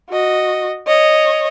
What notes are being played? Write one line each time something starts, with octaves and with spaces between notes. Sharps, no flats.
F#4 D#5
C#5 D#5